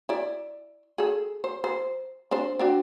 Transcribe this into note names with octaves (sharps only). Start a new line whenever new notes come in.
E4 D5
G#4 A4
C5
C5
C4 D4 C5
C4 D4 F#4